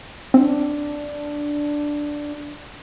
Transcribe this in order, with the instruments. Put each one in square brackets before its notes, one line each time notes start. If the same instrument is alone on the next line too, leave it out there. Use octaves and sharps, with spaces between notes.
[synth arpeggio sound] C4 [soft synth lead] D4